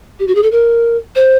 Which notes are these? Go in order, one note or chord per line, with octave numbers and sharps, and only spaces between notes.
G4
F#4
G#4
A4
A#4
C5